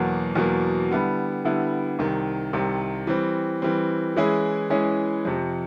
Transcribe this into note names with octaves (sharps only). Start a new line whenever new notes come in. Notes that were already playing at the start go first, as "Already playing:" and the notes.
Already playing: E2 B2 F#3 A#3
E2 B2 F#3 A#3
D3 G3 B3 E4
D3 G3 B3 E4
C2 C3 D#3
C2 C3 D#3
E3 G3 C4
E3 G3 C4
E3 G#3 C#4 E4 G#4
E3 G#3 C#4 E4 G#4
F2 C3 F3